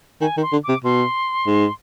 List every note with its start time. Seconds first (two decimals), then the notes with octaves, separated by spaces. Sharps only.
0.21 D#3 G#5
0.37 D#3
0.42 C6
0.52 D3
0.64 C3 D6
0.84 B2 C6
1.47 G#2